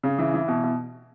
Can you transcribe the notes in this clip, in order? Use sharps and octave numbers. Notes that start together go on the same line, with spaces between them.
C#3
E3
E3
B2
B2